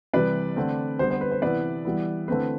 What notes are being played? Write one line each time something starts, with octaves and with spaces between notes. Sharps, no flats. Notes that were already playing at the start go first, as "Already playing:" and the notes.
C3 E3 G3 B4 D5
D3 A3 C4
D3 G3 B3 C5
C5
B4
C5
C3 E3 B3 E4 B4 D5
E3 G3 B3 E4
D3 A3 C4 E4 B4